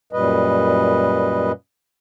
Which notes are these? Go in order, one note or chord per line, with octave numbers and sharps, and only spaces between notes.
F#2 A#2 G3 B4 D#5